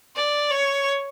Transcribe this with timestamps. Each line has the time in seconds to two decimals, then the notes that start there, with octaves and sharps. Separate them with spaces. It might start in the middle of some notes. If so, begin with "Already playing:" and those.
0.16 D5
0.51 C#5